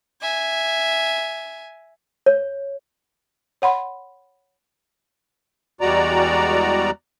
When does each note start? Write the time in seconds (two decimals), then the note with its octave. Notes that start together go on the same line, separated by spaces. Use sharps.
0.22 E5 G#5
2.26 C#5
3.62 C#5 F#5 B5 C6
5.81 E2 G3 G#3 F#4 D5 A#5